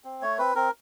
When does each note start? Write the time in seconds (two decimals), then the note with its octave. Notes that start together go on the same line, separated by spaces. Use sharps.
0.04 C4
0.22 A3 C#5
0.38 C4 B4
0.56 C4 A#4